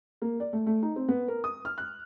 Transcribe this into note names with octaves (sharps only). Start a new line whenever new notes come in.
A#3
D5
A3
A3
D#4
C4
B3
A#4
D#6
F6
F#6